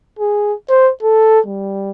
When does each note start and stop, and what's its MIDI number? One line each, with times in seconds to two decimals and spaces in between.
0.19 0.54 68
0.69 0.91 72
1.03 1.40 69
1.46 1.91 55